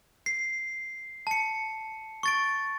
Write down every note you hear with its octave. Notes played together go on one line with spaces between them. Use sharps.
C7
A5 C#7
C#6 A6 D7